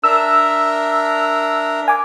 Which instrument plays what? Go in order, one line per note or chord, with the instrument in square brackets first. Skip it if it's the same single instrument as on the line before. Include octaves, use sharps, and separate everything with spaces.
[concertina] D4 A#4 E5 [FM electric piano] E6
[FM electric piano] G#5 D6